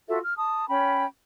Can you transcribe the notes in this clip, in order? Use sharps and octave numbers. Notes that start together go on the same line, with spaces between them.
F4 F#4 A4 E5
F6
A5 D#6
C#4 G5 B5